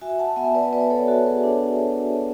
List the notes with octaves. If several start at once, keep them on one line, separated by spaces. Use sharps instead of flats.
F#4 E5 G#5
F#5 A5
B3 E5 G#5
B4 D5
B3 B4 D5
A4 C#5
F#4 A4
G#4 B4
D4
B3
B3